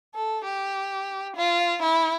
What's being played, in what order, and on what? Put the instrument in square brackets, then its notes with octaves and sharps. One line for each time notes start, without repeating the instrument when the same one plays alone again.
[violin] A4
G4
F4
E4